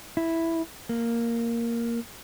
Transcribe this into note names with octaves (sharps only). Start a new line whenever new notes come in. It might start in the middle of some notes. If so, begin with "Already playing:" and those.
E4
A#3